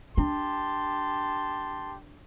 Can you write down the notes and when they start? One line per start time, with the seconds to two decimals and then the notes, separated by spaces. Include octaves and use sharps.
0.17 D4 G4 A5 C6